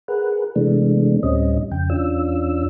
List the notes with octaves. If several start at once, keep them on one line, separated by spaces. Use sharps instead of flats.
G#4 A#4 B4 F#5
C3 E3 G#3 A3 B3 D4
D2 A2 G3 C4 C#4 D#5
F2 C#3 G5
E2 C#4 D4 F4 E6